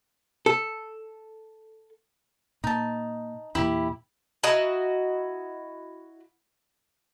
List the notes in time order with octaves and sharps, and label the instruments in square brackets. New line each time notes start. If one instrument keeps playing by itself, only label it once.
[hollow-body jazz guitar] A4
[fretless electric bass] A#2 [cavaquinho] D#4 A5
[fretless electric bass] E2 A#2 [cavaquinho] E4 G4 B5
[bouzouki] E4 F#4 D#5 A#5